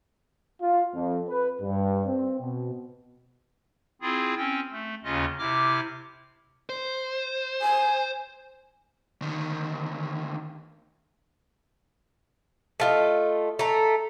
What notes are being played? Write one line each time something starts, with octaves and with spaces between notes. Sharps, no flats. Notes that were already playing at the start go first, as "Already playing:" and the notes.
F4
F2
B4
G2
C4
B2
C4 E4 F4 G#4
C4 C#4 G5
A3
D#2 C#3 C#4 F4 D#5
C3 E4 D6 F6
C5
G#5
D2 D#3
A3 F4 D#5
A3 A#5